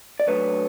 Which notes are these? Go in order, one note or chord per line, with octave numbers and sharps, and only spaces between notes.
D5
F#3 A3 D4 B4 C#5